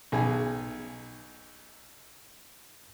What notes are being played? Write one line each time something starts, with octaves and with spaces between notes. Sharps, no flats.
B1 G#4 G#5